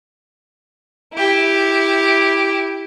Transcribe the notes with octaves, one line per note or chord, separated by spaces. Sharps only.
E4 G4